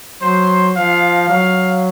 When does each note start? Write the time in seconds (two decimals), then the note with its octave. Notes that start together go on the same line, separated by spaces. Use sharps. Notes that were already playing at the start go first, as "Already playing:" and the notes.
0.22 F#3 C5
0.76 F3 F5
1.29 F#3 F5